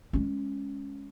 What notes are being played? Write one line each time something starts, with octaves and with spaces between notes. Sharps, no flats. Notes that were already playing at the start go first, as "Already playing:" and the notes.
G#3 C#4